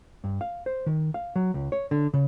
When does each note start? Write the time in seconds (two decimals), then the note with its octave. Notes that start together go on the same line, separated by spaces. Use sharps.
0.24 G2
0.41 F5
0.66 C5
0.86 D#3
1.14 F5
1.36 F#3
1.54 C#2
1.72 C#5
1.91 D3
2.14 C#3